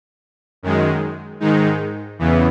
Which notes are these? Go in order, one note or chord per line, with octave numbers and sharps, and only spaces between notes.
F#2 D#3 G#3
G#2 D#3 G#3 D#4
E2 C#3 E3 B3